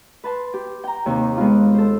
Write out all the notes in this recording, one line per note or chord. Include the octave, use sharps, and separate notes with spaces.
B4 A5 C6
G4
G5 A#5
D#2 C3
G#3 B3 F4
A4 C5